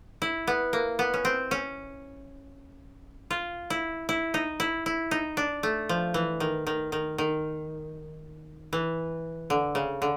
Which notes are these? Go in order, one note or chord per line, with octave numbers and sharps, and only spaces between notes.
E4
B3
A#3
B3
C#4
C4
C#4
F4
E4
E4
D#4
E4
E4
D#4
D4
A3
F3
E3
D#3
D#3
D#3
D#3
E3
D3
C#3
D3